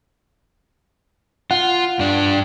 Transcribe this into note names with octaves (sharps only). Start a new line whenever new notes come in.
F4 F#5
G2 D4